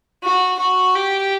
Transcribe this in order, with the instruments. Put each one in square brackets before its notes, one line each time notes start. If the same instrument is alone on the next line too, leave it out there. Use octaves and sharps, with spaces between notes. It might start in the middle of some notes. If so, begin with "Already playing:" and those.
[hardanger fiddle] F#4
F#4
G4